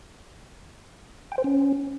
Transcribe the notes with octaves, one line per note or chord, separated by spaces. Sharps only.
G5
C5
C#4